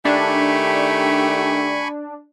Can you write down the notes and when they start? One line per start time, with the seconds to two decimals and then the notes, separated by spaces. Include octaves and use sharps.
0.05 D#3 A3 D4 G4 G#5 B5 C#6